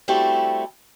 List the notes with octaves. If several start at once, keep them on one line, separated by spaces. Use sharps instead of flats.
G3 A3 C4 E4 F#4 G4